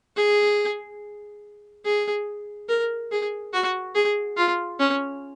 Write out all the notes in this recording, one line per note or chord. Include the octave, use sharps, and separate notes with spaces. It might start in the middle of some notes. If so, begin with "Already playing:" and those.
G#4
G#4
A#4
G#4
F#4
G#4
F4
C#4